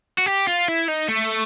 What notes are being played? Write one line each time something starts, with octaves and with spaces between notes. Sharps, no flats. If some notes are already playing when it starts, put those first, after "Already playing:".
F#4
G4
F4
E4
D#4
A3